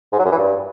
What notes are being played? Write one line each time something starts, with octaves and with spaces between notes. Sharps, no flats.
G#2
F#3
F#2
E3
G2